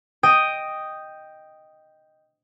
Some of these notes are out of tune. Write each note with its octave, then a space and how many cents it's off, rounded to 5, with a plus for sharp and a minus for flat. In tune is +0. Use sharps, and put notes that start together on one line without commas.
D#5 +0 G5 +0 D#6 +0